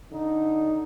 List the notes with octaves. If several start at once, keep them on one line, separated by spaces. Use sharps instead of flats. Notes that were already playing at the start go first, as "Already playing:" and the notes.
D3 D#4